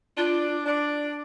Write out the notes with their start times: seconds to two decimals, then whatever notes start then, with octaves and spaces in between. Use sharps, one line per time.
0.17 D4 F4
0.65 D4